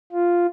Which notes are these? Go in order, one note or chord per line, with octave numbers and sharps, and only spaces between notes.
F4